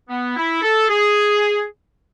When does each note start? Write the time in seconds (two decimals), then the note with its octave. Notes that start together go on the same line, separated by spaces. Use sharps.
0.09 B3
0.36 E4
0.62 A4
0.88 G#4